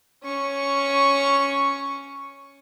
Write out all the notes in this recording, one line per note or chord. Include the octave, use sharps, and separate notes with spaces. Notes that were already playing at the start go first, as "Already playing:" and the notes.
C#4 C#6